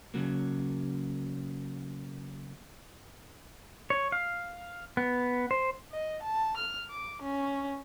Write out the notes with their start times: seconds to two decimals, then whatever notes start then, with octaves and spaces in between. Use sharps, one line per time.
0.14 C#3 F#3 A#3
3.90 C#5
4.12 F5
4.97 B3
5.51 C5
5.91 D#5
6.22 A5
6.57 F6
6.90 D6
7.21 C#4